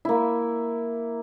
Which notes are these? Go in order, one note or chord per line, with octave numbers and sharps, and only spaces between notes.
A#3 E4